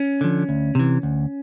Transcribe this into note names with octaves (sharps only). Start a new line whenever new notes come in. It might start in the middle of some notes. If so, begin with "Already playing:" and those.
Already playing: C#4
D3 F3
D2
C3 E3
D2